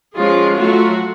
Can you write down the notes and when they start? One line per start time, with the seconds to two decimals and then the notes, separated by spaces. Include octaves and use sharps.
0.17 F3 G#3 C#4 F4 G#4
0.57 F#3 A3 F4 F#4